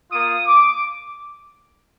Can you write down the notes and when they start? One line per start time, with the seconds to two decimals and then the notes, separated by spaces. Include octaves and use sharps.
0.12 A#3 F4 D#6
0.47 D6